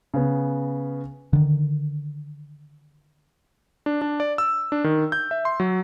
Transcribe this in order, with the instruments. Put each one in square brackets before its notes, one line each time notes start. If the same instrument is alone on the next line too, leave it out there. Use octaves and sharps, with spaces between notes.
[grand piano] C#3 B3
[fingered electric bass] D3 D#3
[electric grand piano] D4
D4
D5
E6
D4
D#3
G6
E5
C6
F#3